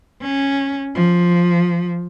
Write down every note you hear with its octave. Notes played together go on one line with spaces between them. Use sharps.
C#4
F3